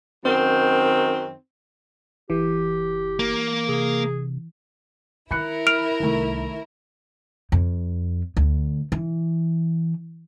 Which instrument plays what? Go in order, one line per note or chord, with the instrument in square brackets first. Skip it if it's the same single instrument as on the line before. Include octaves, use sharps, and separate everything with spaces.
[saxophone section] F#2 D#3 C4
[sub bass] F#1 [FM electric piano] E3 [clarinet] G4
[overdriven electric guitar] A#3
[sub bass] C3 [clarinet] G#4
[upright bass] D#3 [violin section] E4 A#4 [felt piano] B5 F#6 C#7
[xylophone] F6 D7 F7
[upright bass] C2 [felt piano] D#3 A3
[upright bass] F2
D2
E3